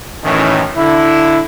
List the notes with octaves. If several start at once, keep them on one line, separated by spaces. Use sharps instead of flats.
F#2 A2 D#3 E3 C#4
D3 E4